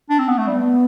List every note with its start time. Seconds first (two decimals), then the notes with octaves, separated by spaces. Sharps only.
0.10 D4
0.19 C4
0.28 B3
0.38 A3
0.47 G3 B3